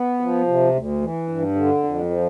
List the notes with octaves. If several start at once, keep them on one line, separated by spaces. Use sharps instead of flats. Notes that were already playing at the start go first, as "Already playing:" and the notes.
Already playing: B3
F3
C3
D2
E3
G2
D3
F2
F3